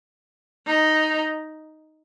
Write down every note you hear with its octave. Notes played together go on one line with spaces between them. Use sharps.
D#4